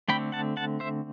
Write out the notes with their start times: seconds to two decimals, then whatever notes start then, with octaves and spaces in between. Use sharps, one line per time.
0.08 D3 A3 C4 G5 B5
0.32 F#5 A5
0.57 F#5 A5
0.80 C5 E5